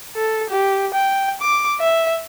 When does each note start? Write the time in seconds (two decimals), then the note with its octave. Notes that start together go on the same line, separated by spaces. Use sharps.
0.15 A4
0.50 G4
0.94 G5
1.41 D6
1.80 E5